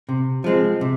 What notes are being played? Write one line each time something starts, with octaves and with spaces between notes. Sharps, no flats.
C3
F3 G#3 C4
C3